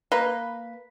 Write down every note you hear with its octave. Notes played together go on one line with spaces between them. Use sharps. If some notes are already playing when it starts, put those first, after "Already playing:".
A#3 B4